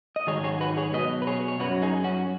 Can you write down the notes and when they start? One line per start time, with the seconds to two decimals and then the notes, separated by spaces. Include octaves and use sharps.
0.16 D#5
0.27 G#2 D#3 F#3 G#4 C#5
0.44 G#4 C#5
0.61 F#4 B4
0.77 G#4 C#5
0.93 B2 F#3 B4 D#5
1.22 B4
1.27 G#4 C#5
1.48 C#5
1.60 F#2 F#3 F#4 B4
1.82 D#4 G#4
2.04 C#4 F#4